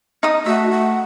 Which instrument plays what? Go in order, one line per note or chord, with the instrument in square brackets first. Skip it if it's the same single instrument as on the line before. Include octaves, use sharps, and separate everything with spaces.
[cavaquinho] D#4 D#6
[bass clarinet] A3 [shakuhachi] F#4 [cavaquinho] E5
[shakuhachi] F#5